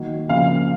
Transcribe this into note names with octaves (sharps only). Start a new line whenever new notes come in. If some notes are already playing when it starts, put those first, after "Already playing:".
Already playing: D#3 F#3 A#3
C#3 F3 A#3 F5